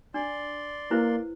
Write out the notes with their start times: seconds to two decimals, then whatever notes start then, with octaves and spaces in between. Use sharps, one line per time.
0.14 D4 D5 C6
0.91 A#3 E4 B4 C5